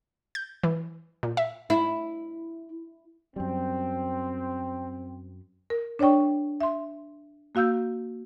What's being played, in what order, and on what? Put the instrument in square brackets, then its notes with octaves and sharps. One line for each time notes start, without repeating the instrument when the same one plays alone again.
[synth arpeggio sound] G6
E3
A#2
E5
[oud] E4
[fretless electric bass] F#2 G3 [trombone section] C4
[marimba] A#4
D4 C#5 D5 G5 C#6
E5 C6
A#3 F#4 F5 E6 G6